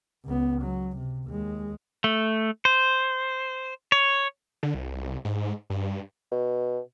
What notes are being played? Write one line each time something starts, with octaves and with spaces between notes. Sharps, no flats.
C#2 B3
F#3
C3
D#2 G#3
A3
C5
C#5
D3
C2
G#2
G2
B2